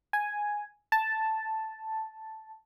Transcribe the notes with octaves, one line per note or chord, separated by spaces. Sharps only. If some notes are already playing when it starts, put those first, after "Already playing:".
G#5
A5